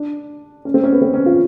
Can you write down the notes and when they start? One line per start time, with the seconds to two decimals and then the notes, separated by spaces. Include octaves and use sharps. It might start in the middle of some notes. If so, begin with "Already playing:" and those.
Already playing: D4
0.65 C#4
0.74 C4
0.84 C#4
0.92 B3
1.02 C4
1.14 C#4
1.26 F4